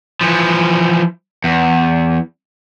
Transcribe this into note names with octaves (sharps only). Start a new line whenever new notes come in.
E3 F3
E2